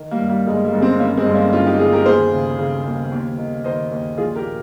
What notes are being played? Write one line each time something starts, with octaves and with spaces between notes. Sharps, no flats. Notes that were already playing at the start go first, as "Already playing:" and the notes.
Already playing: D#3
G3 A#3
G2
G3 A#3
G1 G#3
G3 A#3
G1
G#3 C4
D#3 A#3 C#4
G#3 C4
G2
A#3 C#4
G1 C#4 F4
D#4 G4
G1 F4 G#4
G4 A#4
D#2 G#4 C5
C#3
C#3
D#2
D#2
D#3
D#3 C5 D#5
D#2
A#1 F4 G#4
G4 A#4
A#2